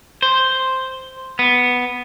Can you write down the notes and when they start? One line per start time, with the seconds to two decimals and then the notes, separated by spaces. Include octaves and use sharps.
0.22 C5
1.39 B3